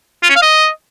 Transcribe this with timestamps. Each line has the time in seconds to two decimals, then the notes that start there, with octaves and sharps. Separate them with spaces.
0.23 F4
0.29 C#4
0.36 F5
0.42 D#5